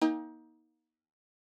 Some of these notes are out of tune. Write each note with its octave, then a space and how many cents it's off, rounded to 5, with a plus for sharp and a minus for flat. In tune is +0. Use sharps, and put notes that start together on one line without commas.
A#3 +40 D#4 +25 G5 +40